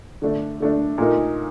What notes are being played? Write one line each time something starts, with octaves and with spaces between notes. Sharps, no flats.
D3 A3 D4
D3 A3 D4
A#2 A3 D#4 A#4